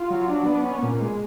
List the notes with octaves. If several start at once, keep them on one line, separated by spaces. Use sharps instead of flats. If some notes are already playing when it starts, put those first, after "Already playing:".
Already playing: F4
F#3
D4
B3
C#4
A#2
G#3